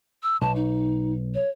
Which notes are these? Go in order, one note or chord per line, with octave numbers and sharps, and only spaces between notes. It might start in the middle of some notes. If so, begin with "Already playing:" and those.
E6
B1 A5
D#4
C#5